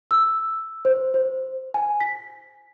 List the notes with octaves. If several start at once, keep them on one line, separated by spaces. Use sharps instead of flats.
E6
C5
C5
G#5
B6